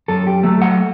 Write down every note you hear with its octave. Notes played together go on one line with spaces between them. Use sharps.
F#2 A4
G4
F#3 A3 A4
F#5